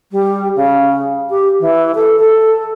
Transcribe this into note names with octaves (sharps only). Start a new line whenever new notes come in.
G3
C#3
G4
E3
A4
A4